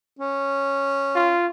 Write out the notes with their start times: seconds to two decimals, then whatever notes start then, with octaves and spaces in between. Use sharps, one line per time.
0.19 C#4
1.15 F4